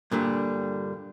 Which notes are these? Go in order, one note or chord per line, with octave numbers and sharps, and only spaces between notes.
G2 A#2 D3 G3